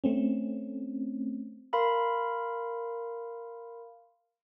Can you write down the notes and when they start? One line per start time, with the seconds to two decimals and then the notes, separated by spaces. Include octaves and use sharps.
0.04 A3 C4 C#4
1.73 A#4 F5 B5 C6